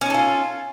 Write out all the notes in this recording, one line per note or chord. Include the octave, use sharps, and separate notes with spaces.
C#4 D#4 F4 A4